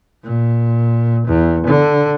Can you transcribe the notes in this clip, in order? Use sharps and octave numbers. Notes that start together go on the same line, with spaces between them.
A#2
E2
D3